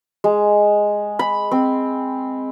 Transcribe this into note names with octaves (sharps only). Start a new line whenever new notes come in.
G#3
B5
C4